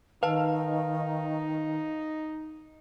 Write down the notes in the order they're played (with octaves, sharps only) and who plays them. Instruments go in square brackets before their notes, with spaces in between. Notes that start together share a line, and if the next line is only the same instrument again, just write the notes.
[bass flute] D#3 [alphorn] D#4 [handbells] B4 A5 [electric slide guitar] F5